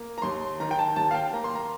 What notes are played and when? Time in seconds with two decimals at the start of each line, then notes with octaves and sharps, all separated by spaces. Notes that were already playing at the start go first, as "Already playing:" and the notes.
Already playing: A#3
0.18 A#5
0.22 D#2 C6
0.60 D#3 A#5
0.71 G5
0.79 A5
0.96 D#2 A5
1.11 F5
1.14 G5
1.33 A#3 A#5
1.44 C6
1.55 A#5